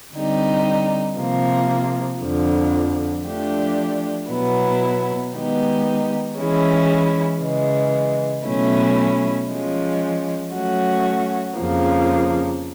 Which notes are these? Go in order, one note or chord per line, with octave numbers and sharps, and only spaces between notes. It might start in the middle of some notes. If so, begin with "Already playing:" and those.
D3 G3 C4 D#4 G4
C3 F3 A#3
F2 D3 F3
F3 A3 D4 G4
B2 F#3 B3 E4
D#3 G#3 B3 D#4 G4
E3 G#3 C#4 E4
C#3 E3 G#3
B2 F#3 A3 C#4 E4
F3 G#3 C#4
F#3 A3 C#4 F#4
F2 C#3 F3 A#3